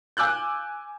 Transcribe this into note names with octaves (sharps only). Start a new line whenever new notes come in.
G#5 D6 E6 F#6 G6